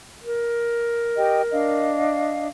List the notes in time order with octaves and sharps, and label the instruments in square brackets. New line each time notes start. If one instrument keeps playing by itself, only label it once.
[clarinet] A#4
[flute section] G4 D#5 G5
D4 D#5 F5